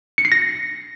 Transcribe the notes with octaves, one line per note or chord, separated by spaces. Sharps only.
C#7
C7
A#6